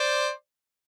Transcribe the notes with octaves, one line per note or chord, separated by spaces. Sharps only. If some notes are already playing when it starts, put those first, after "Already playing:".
Already playing: C5 D5